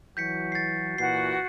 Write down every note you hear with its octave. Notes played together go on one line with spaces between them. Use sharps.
E3 F#3 F#4 G6 B6 C#7
A6 C7
A#2 E3 F#4 C7